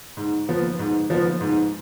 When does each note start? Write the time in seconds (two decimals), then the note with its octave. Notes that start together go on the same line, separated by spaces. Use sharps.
0.17 G#2
0.49 F3 B3
0.79 G#2
1.10 F3 B3
1.41 G#2